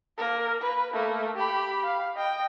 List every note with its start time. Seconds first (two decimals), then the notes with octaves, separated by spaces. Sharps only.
0.18 A#3 A#4
0.61 B4
0.93 A3 A#3
1.36 G4 B5
1.85 F5
2.16 D#5 G5